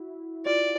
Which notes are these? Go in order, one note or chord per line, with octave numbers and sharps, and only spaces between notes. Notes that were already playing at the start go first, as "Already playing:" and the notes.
Already playing: E4 F#4
F4 G4 D5